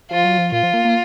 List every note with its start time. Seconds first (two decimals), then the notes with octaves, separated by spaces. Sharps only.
0.10 F3 F4
0.24 F#3
0.38 F3
0.52 A#2 F4
0.63 F3
0.74 A#3
0.85 A#3